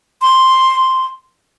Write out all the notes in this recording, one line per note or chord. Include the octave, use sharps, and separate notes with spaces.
C6